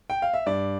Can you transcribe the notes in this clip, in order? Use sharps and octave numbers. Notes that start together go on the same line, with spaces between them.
G5
F5
E5
G2 D5